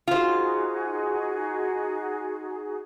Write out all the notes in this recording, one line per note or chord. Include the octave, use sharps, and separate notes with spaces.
D#4 F4 F#4 G#4 C5